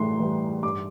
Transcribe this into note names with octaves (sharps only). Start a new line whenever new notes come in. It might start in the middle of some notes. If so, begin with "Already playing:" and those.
Already playing: A2 E3 G3 C6
E3 G3
G2 D6